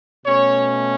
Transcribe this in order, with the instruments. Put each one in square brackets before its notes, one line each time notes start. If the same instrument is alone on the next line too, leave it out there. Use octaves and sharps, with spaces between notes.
[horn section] B2 A3 C#4 C#5